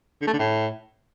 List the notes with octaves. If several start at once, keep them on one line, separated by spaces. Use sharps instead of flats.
D3
A3
D3
A2